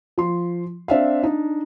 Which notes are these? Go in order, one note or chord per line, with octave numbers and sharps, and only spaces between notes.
F3 C6
C4 D4 E5 F5
D4 D#4